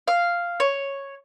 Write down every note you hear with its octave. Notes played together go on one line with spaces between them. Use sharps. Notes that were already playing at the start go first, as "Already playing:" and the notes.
F5
C#5